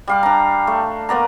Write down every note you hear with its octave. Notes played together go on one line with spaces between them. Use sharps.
G3 F5 D6
D4 A#5
A3
A#3 B3 D5 A#5